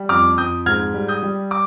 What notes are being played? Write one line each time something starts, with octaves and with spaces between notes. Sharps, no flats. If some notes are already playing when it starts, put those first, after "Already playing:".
Already playing: G3
F2 D6 F6
F2 D#6 G6
G#2 F6 G#6
G3
D#6 G6
G3
D6